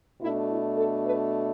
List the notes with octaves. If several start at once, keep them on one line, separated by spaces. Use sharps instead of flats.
B2 A3 D4 E4
E4
A4
B4